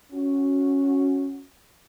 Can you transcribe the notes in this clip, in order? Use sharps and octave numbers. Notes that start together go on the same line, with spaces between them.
C#4 F#4